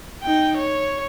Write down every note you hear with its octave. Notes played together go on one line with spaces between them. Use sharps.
D#4 G5
C#5